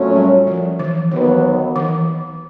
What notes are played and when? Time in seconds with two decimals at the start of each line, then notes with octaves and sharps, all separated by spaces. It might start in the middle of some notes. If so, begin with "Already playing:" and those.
Already playing: A#2 F#3 A3 C#4
0.15 G3
0.47 F3
0.79 E3
1.11 D#2 D#3 E3 F#3 B3
1.76 E3